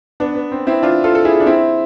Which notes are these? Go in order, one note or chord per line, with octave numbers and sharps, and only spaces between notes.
B3 D4
B3
C4
C4 E4
D4 F4
F4 A4
A4
E4 G#4
D4
C4 E4